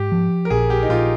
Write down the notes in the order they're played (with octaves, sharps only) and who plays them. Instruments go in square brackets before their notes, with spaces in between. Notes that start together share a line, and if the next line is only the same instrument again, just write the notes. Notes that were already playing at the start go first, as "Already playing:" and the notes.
Already playing: [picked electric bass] G#2 [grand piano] G4
[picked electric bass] F3
[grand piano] A#4
[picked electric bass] A#1 [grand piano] G#4
[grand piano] G4
D#4
[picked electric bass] A#1 [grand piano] F4